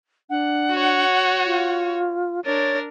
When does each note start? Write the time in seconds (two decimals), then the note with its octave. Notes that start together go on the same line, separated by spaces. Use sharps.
0.30 D4 F#5
0.71 F#4 C#5
1.46 F4
2.45 D4 A#4 C#5 A6